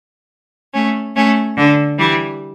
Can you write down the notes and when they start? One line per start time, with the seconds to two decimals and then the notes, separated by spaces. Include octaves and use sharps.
0.73 A3 C#4
1.15 A3 C#4
1.57 D3
1.98 E3 G3